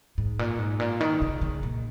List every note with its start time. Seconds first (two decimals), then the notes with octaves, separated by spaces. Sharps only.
0.18 G#2
0.39 A#2
0.59 G#2
0.80 A#2
1.01 D#3
1.22 C#3
1.41 C#3
1.63 A#2